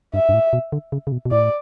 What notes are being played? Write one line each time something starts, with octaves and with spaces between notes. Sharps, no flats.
G2 E5
G2
A2
B2
D3
C#3
C#3
B2
B2
A2 D5